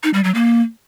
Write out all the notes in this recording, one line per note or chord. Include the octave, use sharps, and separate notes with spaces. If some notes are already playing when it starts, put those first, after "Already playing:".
D#4
G3
F#3
A#3